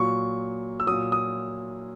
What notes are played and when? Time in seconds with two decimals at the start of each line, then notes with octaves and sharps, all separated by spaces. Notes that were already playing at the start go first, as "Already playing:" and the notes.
Already playing: A#2 F#3 C#6
0.80 E6
0.87 A#2 F#3 D#6
1.12 D#6